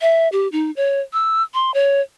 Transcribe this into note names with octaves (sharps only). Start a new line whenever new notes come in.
E5
G4
D#4
C#5
E6
C6
C#5